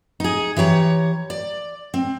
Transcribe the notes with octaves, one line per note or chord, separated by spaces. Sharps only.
D#4 G#4
E3 G4 C#5 A#5
D5
C4